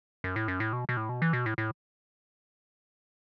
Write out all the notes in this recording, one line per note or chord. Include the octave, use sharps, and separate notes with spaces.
F#2
A2
F#2
A2
B2
B2
A2
B2
E3
B2
A2
A2